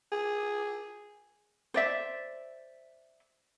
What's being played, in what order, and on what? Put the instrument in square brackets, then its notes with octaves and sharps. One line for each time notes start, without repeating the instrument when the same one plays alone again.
[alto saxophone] G#4
[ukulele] C5 D5 E5